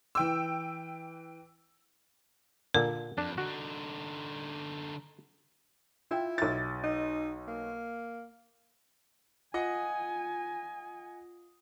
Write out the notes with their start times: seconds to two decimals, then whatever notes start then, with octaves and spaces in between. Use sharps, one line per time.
0.15 E3 G5 E6
2.74 A#2 D3 A#4
3.18 F2 D4
3.38 D3 D#4 F#4
6.11 E4 F4 G5
6.38 B1 A6
6.84 D#4
7.48 A#3
9.54 F4 D#5 F#5 G#5 D#6